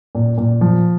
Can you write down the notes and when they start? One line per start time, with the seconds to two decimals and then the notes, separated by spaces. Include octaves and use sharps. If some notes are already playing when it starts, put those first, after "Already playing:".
0.15 A#2
0.38 A#2
0.61 F3